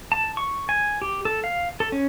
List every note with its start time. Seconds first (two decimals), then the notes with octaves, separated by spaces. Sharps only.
0.12 A5
0.37 C#6
0.69 G#5
1.02 G4
1.25 A4
1.44 F5
1.80 A4
1.92 C#4